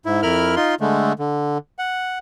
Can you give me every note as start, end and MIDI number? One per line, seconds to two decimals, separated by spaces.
0.06 0.22 44
0.06 0.22 64
0.23 0.55 41
0.23 0.55 64
0.23 0.55 70
0.23 0.55 83
0.23 0.55 89
0.56 0.75 63
0.56 0.75 65
0.56 0.75 84
0.81 1.13 50
0.81 1.13 56
0.81 1.13 57
1.19 1.58 50
1.79 2.19 78